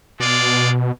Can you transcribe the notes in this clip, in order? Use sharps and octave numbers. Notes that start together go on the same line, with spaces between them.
B2 G#3 F4 D5